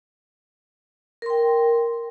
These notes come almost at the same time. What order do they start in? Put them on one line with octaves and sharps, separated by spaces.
A#4 C6 G5